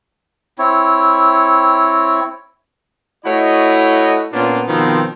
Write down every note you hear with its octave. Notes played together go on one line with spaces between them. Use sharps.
C4 E4 C#5
A3 E4 F#4 C#5 D#5
A#2 A#3 B3 C#4 D4 F4
B2 D#3 F3 B3 C4